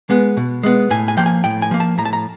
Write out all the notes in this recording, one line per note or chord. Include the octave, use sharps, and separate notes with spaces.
G#3 B3
B2
G#3 B3
A2 G#5
G#5
F3 A#3 G5
G#5
A2 G5
G#5
F3 A#3
A5
A2 A#5
A5
A#5